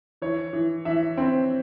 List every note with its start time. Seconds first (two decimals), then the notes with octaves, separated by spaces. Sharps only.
0.22 E3 C#5
0.53 E3
0.85 E3 E5
1.17 C4